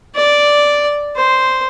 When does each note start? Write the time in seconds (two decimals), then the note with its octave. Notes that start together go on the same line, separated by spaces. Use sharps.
0.15 D5
1.16 C5